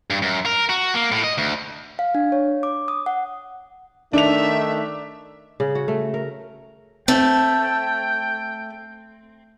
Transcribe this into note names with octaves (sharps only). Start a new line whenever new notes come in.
G2
F#2
A#4
F#4
A#3
A2
D#5
D2
F5
D4
C#5
D6
D#6
F#5
D#3 A3 D4 D#4 E5 F7
C#3
F#4
A3
A#4
A3 C4 G5